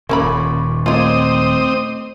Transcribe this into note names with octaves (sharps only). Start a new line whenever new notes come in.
D#1 A#2 A#3 C#4 B5 C#6 D6
A3 C4 F4 C#5 D#5 D6 D#6